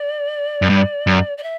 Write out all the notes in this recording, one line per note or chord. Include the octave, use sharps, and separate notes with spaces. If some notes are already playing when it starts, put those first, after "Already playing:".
Already playing: D5
F#2
G2
F#2
D5
E5